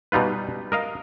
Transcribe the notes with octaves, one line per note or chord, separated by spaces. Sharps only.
B2 G3 D#4 F4 B4
A#4 D#5 F5